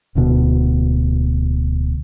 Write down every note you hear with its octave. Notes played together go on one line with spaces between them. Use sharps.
D1 D2 B2